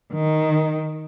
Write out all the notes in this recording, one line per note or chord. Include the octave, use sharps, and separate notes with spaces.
D#3